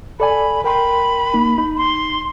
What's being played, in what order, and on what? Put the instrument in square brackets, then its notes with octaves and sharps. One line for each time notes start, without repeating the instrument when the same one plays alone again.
[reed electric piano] A4 D5 G#5 [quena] B5
[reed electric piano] A#4 G5 C6 [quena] B5
[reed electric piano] A#3 D#4
D#4
[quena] C6